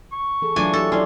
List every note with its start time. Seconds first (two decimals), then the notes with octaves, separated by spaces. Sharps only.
0.12 C#6
0.42 E3 G#4 A4
0.56 E3 F#3 A3 D4 F4 G#5
0.73 E4 G4 A4
0.92 F#3 C#4 E4 D5 C6